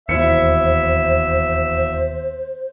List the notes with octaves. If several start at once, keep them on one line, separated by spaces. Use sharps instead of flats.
E1 D#2 E4 C5 E5 C#7